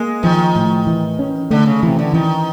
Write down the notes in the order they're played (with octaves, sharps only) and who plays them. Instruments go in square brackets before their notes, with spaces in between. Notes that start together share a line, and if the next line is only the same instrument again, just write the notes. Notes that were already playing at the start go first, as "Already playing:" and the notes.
Already playing: [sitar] G#3 [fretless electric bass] A#3
[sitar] D#3 [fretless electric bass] F3
[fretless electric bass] A2
E3
C#4
[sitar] D3 [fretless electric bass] A3
[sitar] C#3
[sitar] C3 [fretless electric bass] E3
[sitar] D3
[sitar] D#3 [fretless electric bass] E3